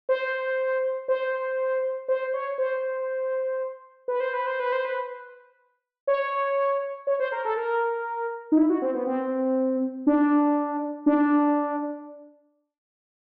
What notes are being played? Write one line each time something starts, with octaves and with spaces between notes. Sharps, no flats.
C5
C5
C5
C#5
C5
B4
C5
B4
C5
B4
C5
B4
C#5
C#5
C5
A#4
A4
A#4
D#4
E4
F#4
C4
B3
C4
D4
D4